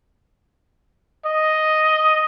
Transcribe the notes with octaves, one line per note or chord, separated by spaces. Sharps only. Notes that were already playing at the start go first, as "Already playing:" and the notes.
D#5